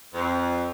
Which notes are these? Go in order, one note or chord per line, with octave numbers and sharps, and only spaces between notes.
F2